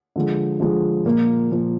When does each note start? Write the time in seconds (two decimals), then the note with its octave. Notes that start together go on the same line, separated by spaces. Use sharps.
0.16 D3 F3 G#3
0.60 D3 F3 G#3
1.05 A#2 F3 A#3
1.51 A#2 F3 A#3